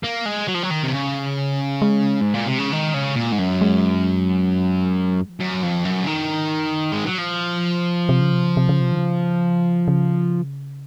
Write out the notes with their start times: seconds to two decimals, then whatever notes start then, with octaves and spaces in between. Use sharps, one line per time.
0.03 A#3
0.25 G#3
0.48 F#3
0.55 F3
0.63 F#3
0.71 D#3
0.83 C3
0.92 C#3
1.82 G#3
2.21 G#2
2.34 A#2
2.46 C3
2.58 C#3
2.72 D#3
2.94 C#3
3.16 A#2
3.32 G#2
3.39 F#2
3.61 G#3
5.29 F3
5.40 F#2 F#3
5.63 F2
5.76 D#3
5.84 F#2 F3
6.03 C#3
6.07 D#3
6.14 F2
6.22 F#2
6.29 G#2
6.59 F#2
6.89 G#2 G#3
7.06 F#3
7.18 A#2 F3
7.64 C3
8.09 C3
8.21 C#3
8.32 C3
8.44 C#3
8.57 C3
8.69 C#3
8.81 C3
8.92 D#3
8.97 C#3
9.88 C#3